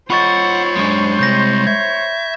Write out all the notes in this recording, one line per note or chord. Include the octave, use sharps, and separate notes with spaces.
F4 C5 C#5 D#5 F#5 B5 C#6 A6
F#2 G#3 D4
C3 G3 G6 A#6
E5 G#6